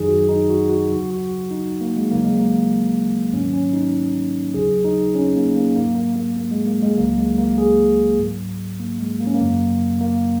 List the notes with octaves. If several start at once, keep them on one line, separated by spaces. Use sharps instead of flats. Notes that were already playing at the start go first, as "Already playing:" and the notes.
Already playing: F#2 D#3 F#3 D#4 G#4
F#4
D#4
F#4
F#4
D#2 C#3 F#3 F#4
F#4
D#4
A#3
G#3
D#2 C#3 F#3 A#3
G#3
A#3
G#2 D#3 F#3 C#4
C#4
D#4
D#2 C#3 F#3 G#4
D#4
C#4
A#3
A#3
G#2 F#3 A#3
A#3
A#3
A#3
G#3
A#3
G#3
C#2 C#3 F#3 A#3
G#3
A#3
G#4
G#2 F#3
A#3
G#3
A#3
C#4
A#3
F#2 C#3 F#3
A#3